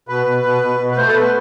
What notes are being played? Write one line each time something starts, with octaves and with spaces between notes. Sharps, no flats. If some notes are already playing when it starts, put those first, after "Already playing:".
B2 B4
B2
B2
B2
B2
B4
A3 C5
A4
B2 B4